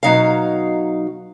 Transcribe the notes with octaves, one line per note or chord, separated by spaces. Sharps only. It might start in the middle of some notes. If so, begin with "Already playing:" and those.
B2 F#3 D#4 F5